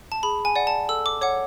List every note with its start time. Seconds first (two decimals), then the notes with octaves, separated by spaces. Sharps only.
0.12 A5
0.23 G#4 B5
0.45 G#5
0.56 D5 F#5
0.67 A5
0.89 A4 E6
1.06 D6
1.21 C#5 F#5 D6